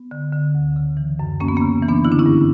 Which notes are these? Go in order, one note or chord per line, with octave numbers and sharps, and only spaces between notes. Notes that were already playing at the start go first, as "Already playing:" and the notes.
Already playing: B3
D3
D3
D2
C#3
E3
F#2
F#2 A#3 C#4
B3
C#3 A#3 C#4
E3
B3 D4
D3 E4
D4
C#4 E4
G2